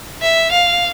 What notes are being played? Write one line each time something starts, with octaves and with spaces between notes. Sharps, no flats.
E5
F5